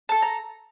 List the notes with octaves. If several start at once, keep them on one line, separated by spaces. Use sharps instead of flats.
A4 A5
A#5